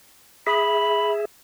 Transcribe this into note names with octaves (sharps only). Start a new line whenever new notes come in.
G#4 E5 B5